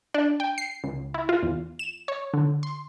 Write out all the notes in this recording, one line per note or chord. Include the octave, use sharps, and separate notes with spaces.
D4
G5
C7
C#2
E4
F4
E2
E7
C#5
D3
C6